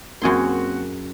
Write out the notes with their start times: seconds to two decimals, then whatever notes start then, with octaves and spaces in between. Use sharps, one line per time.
0.22 F#2 A#3 C4 F#4 G#4 C6